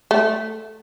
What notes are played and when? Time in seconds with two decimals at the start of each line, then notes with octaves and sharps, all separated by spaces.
0.11 A3